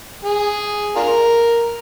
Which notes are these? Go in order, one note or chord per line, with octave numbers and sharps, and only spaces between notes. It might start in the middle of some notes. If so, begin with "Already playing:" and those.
G#4
D4 F4 A#4